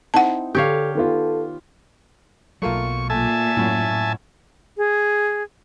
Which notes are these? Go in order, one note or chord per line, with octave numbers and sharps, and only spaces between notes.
C4 D#4 E4 F#5 A5
D3 G4 A4 C#5 F5 G6
D#3 B3 F4 A4
B1 F#3 A3 A#3 F4 C#6
A#2 A3 E5 G#5 A5
F#2 A2 E4
G#4